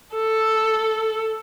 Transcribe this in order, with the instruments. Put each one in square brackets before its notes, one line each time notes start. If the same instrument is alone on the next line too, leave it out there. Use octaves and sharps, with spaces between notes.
[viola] A4